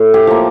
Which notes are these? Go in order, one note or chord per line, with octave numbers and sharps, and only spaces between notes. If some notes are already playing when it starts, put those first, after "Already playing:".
Already playing: A2
G4
F3 A#3